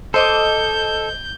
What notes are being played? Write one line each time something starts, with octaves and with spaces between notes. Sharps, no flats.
A4 C5 D#5 D6 G6